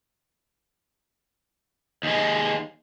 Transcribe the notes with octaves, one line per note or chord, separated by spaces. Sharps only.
D#2 G#3